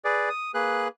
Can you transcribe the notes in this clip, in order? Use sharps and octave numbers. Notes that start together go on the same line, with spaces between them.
G#4 B4 D5
D#6
A#3 G#4 B4 F#6